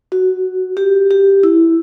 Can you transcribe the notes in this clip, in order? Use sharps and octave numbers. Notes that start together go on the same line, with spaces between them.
F#4
G4
G4
E4